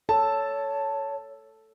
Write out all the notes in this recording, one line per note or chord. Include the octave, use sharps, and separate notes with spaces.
A4 C#5 A5